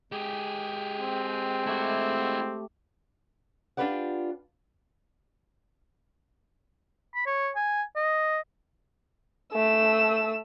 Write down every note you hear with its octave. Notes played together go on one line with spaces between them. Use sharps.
G#3 G4 G#4
C4
A3 E4 F#4 G4
D4 F4 G4 B4 D5 F#5
B5
C#5
G#5
D#5
A3 E6